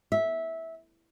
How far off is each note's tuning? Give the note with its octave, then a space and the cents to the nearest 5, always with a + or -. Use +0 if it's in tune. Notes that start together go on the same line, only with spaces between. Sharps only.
E5 -15